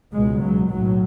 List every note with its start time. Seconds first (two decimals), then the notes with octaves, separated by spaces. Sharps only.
0.12 C#2 B2 G#3
0.41 F#3
0.70 B1 A2 F#3